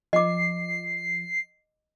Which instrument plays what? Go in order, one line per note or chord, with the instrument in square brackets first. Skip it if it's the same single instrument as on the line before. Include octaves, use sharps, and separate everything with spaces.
[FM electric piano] F3 [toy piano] D#5 D6 [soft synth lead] C7